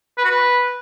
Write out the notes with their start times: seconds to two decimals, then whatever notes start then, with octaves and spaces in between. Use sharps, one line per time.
0.18 B4
0.24 F#4
0.31 B4